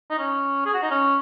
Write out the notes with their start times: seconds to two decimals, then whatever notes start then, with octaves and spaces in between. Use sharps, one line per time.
0.10 D#4
0.19 C#4
0.66 G#4
0.74 F#4
0.82 D#4
0.91 C#4